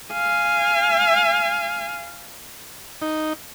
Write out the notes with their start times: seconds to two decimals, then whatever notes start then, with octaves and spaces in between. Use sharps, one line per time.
0.13 F5 G#5
3.02 D#4